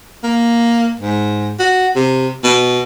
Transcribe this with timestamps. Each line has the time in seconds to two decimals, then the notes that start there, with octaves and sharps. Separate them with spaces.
0.24 A#3
0.99 G#2
1.59 F#4
1.95 C3
2.44 B2